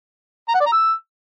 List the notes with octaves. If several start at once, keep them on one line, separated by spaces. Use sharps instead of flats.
A#5
F#5
D5
A#5
E6